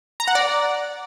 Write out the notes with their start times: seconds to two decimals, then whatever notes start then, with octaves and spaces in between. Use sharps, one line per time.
0.20 A#5
0.28 F#5
0.35 D5